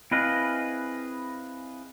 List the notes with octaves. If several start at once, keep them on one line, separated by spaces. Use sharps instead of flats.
C4 E4 G#4 B4 D#5 F5